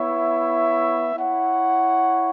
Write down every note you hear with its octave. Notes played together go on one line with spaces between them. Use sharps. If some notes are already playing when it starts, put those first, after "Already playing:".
Already playing: B3 E4 C#5 E5
E4 C#5 F#5